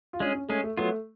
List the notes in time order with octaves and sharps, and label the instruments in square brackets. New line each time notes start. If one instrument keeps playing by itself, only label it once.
[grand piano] F4
[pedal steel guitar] G#3 C#4 G#4 [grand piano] D4
[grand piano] C#4
[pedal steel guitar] G#3 C#4 G#4 [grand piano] A3
[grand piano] A3
[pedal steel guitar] F#3 B3 F4 [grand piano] A3